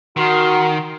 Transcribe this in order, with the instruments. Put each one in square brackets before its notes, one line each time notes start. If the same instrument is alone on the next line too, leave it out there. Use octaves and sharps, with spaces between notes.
[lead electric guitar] D#3 [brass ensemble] F#4 F#5 [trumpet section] A#4 [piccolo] C6